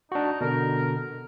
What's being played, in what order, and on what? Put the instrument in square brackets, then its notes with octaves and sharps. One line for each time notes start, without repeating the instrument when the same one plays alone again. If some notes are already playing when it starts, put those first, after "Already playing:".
[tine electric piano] D4 F#4 [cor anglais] D#4
[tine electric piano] B2 D3 [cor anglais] A#4